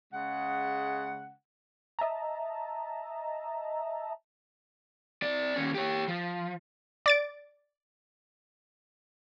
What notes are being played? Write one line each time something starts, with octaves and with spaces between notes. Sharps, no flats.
C#3 G#3 F#5
D#5 E5 A5 A#5
C4 D5
D#2 C#4
G4 C#5
F3
D5 A6 D7